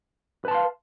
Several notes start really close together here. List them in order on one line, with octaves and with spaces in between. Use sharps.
B4 A5 C6 F5